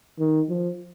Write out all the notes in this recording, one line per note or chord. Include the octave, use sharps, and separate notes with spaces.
D#3
F3